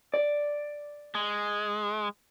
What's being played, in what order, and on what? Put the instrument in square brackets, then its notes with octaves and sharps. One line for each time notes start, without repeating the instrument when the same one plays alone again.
[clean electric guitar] D5
[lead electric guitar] G#3